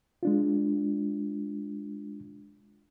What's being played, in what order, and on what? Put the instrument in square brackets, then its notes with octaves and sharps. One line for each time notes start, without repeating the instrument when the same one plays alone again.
[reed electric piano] G#3 D4 F4